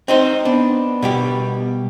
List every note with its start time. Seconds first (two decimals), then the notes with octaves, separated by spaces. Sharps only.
0.08 C4 D#4 C5
0.45 B3 D4
1.02 B2 G3 G4